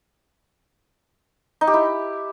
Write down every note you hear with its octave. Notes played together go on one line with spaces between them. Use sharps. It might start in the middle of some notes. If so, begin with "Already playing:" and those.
D#4
G4
E4